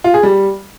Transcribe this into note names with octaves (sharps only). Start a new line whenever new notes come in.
F4
G#4
G3